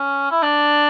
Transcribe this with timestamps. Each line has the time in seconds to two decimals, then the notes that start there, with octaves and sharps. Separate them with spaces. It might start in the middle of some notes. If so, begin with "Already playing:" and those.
Already playing: C#4
0.31 E4
0.42 D4